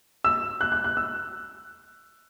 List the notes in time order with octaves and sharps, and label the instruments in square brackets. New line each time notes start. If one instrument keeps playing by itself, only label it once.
[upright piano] E6
F#6
F#6
F#6
E6